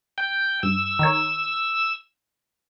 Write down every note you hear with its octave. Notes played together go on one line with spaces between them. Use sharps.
G5
G2 E6
D#3 A#4 C#5